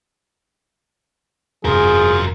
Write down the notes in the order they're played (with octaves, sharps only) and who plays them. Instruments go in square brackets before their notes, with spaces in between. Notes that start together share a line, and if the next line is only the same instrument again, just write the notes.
[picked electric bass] F1 G2 C3 [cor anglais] F3 [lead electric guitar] F#4 A#4 [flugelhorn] G#4